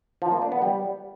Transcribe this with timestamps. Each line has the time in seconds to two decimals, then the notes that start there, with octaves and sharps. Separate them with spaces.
0.22 F3
0.32 A#3
0.42 D4
0.52 B3
0.62 G3